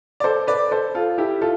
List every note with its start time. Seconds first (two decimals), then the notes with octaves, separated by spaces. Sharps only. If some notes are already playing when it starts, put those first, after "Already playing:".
0.20 D5
0.24 A4 C5
0.47 B4 D5
0.71 A4 C5
0.95 F4 A4
1.18 E4 G4
1.41 F4 A4